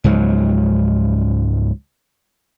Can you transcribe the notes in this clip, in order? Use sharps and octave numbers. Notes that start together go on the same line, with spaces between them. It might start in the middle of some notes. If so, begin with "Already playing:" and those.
C#2 G#2 F3 F#3